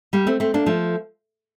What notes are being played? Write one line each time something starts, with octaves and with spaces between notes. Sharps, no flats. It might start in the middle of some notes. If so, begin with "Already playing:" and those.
G3 A#3
A3 C4
A3 C4
A#3 D4
F3 A3